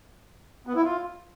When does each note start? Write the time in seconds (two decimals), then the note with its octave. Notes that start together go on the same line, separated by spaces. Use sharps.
0.67 B3
0.75 E4
0.84 F4